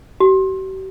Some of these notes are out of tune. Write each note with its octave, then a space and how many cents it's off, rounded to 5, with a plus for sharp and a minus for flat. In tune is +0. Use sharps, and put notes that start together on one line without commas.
G4 -45